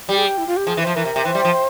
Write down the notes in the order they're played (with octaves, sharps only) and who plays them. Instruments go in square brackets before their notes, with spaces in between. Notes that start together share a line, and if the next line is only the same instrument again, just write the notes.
[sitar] G3 [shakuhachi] G4
[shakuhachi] G#4
G4
E4
F4
G4
[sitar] F3 [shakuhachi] G#4
[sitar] E3
[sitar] F3 [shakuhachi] C5
[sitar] E3 [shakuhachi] A#4
[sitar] C3
C3
[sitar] E3 [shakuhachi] C5
[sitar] G3
F3